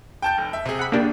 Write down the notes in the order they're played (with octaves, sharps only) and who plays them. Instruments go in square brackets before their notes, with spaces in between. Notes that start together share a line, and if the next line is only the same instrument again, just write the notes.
[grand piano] G5 A5 G6
F1
E5
C3 G#4
[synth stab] F#5 B5
[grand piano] G1 [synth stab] A#3 D4 G4